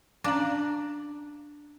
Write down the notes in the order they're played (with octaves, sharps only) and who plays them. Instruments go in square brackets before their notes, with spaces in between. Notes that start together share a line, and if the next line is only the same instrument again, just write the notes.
[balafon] C#4 F5 A#5 [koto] D4